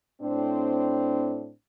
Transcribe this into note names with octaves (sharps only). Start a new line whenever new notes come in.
A2 C4 D4